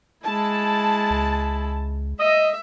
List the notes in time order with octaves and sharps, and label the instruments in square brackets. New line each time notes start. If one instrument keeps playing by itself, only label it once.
[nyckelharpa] G#3 E4 [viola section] A5
[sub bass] C#2
[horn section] D#5 [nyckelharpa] E5